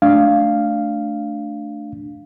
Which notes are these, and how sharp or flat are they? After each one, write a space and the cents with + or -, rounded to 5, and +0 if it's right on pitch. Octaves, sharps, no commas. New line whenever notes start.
A3 +0 D4 +0 F5 -5